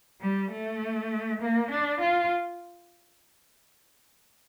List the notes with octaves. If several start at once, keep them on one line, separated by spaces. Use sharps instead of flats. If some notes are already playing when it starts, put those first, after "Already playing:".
G3
A3
A#3
D4
F4